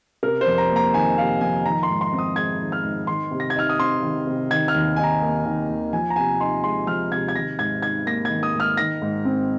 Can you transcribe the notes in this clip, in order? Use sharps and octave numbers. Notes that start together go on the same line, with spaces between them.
C3 A#4
C5
F2
A#5
A#3
A#5
D#3 G#5
C3 F5
F2 G#5
D#3 A#5
C6
G#2
C6
C4
D#6
G#3 G#6
D#3
F6
G#2
D#3 C6
C3
A#6
G#6
D#4 F6
D#6
C4 C6
D#3
C3
D#3 G#6
F6
D#2
D#4 G#5
A#5
A#3
D#3
D#2
F3 G#5
A#5
C3 G#5
D#4 C6
G#3 C6
F3 F6
C3 G#6
G#6
D#3 A#6
G#2 G#6
D#4 G#6
A#3 A#6
D#3 G#6
D#6
G#2
F6
D#3 A#6
G#2
C4